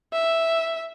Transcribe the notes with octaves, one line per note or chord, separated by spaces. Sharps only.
E5